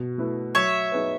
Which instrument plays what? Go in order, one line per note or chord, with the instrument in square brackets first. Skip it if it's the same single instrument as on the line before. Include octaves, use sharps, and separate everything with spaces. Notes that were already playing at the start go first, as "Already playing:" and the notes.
Already playing: [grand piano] B2
A3 E4 B4
[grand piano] F#3 [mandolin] C#5 E5
[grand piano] B3 D#4 G#4 B4